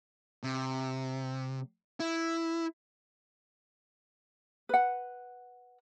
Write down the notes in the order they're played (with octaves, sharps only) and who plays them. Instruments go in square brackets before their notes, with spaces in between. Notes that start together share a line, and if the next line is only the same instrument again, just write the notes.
[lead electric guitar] C3
E4
[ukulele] B4 F#5